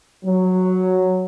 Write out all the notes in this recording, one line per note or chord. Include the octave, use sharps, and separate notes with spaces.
F#3